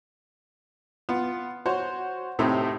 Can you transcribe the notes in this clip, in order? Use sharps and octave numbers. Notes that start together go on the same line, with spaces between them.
B3 F4
F#4 C5 C#5
A2 C3 A3 C4 D#4